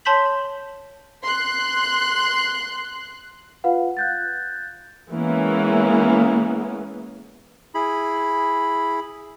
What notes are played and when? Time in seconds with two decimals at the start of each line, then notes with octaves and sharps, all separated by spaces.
0.05 C#5 A5 C6 G6 B6 F#7
1.23 C6 F#6
3.64 F4 B4 F5 F#5
3.97 F#6 G6 A6
5.11 E3 G#3 A#3 B3 C#4
7.75 E4 G#4 B5